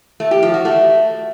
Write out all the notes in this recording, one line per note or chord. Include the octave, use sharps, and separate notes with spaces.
A3
G4
F3
F#4
A3